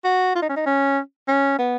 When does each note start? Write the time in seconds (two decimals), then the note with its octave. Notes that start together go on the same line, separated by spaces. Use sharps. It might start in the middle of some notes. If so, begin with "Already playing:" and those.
0.04 F#4
0.35 F4
0.42 D#4
0.49 C#4
0.56 D#4
0.66 C#4
1.28 C#4
1.59 B3